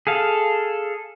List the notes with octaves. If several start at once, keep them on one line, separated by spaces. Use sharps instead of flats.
G#4 A4 F5